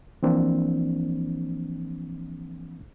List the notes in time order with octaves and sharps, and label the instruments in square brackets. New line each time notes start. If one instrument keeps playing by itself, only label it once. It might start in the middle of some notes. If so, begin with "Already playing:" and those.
[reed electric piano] E3 F3 A#3 C4 D4